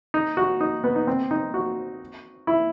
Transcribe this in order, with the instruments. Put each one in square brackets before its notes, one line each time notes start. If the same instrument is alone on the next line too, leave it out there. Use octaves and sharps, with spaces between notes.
[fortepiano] D#4
F#4
D#4
B3
D#4
C4
D#4
F#4
E4